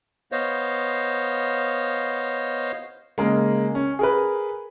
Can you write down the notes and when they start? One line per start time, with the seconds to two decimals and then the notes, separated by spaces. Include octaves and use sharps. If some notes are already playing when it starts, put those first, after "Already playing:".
0.32 B3 C5 C#5 D#5 F5
3.18 C#3 G#3 A#3
3.75 C#4
3.99 G#4 A#4 B4